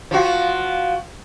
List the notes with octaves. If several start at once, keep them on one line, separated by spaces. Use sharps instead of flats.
F3 F#4